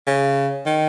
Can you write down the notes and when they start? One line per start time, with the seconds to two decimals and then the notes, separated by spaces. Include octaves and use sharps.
0.07 C#3
0.66 D#3